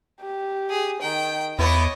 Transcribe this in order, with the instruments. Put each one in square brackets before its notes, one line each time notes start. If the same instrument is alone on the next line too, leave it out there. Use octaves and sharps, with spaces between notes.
[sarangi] G4
[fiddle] G#4
[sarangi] D#3 [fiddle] G5
[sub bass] E2 [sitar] A3 B3 E4 [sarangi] C#5 [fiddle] D#5 D6